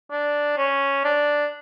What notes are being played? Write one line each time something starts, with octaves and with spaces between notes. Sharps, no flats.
D4
C#4
D4